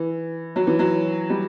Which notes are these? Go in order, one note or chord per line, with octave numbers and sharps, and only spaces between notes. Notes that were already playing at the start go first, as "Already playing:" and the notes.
Already playing: E3
F#3
E3
F#3
G3